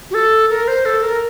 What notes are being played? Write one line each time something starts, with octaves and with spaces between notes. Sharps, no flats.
F#4
A4
A#4
C5
A4
A#4